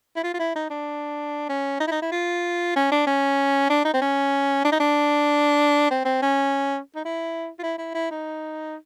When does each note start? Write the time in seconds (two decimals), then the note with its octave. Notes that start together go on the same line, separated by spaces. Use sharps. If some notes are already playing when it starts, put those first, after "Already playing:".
0.16 E4
0.24 F4
0.34 F4
0.39 E4
0.55 D#4
0.70 D4
1.49 C#4
1.80 D#4
1.87 E4
1.91 D#4
2.02 E4
2.12 F4
2.76 C#4
2.91 D4
3.07 C#4
3.70 D4
3.85 D#4
3.93 C4
4.02 C#4
4.65 D4
4.72 D#4
4.80 D4
5.90 C4
6.05 C4
6.22 C#4
6.95 D#4
7.05 E4
7.59 F4
7.63 E4
7.78 E4
7.94 E4
8.11 D#4